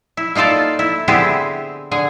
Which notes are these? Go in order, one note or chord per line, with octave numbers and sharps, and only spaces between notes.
E4
A#3 D#4 F4 A4 D5
E4
D3 B3 C4 E4 G4 G#4
D3 G#4